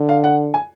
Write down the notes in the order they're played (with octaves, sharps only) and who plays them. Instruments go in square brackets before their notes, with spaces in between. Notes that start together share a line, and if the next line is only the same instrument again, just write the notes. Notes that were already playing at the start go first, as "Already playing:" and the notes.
Already playing: [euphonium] D3
[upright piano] F5
F#5
G#5